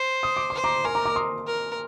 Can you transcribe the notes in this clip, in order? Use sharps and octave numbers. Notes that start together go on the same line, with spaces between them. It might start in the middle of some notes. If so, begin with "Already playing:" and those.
Already playing: C5
D#6
D6
C5 C6
A#5 D6
A#4 G#5 C6
A#5 D6
A#5 D6
C6 D#6
A#4